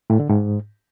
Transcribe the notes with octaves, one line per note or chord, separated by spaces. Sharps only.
A2
D3
G#2